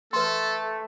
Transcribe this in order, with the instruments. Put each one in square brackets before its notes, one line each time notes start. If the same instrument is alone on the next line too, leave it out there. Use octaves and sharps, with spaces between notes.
[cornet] A3 [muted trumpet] A4 [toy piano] B4 C6